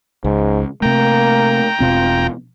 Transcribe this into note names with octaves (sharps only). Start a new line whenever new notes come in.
C#2 G#2
C3 A3 A#3 G5 A#5
E1 B2 C4 F4